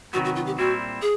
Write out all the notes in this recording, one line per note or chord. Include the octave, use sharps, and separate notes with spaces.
C3 D#3 F#3 B3 F#4
F#4
F4
G4
A#2 G3 C4 E4 F#4
G#4